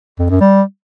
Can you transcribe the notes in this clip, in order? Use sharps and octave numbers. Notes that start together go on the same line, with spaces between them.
F2
F#2
G3